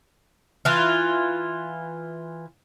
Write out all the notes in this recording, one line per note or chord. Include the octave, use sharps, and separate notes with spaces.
E3 F4